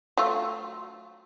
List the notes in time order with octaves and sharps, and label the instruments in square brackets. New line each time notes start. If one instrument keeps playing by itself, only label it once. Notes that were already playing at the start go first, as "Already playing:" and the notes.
[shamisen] F#3 A3 F4